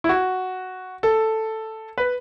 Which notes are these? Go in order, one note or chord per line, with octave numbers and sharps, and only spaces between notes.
E4
F#4
A4
B4